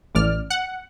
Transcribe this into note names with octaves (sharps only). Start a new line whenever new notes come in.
A1 D5 F6
F#5